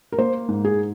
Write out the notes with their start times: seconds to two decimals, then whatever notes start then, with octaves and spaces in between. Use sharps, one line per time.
0.12 A#4
0.18 A#3 C5
0.49 G#2
0.65 G#4